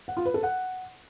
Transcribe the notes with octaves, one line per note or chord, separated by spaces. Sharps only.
F#5
F4
B4
A4
F#5